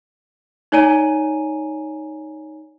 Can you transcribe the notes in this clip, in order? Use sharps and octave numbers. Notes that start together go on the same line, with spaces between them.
D#4 C#5 D5 G#5 A#5 D#7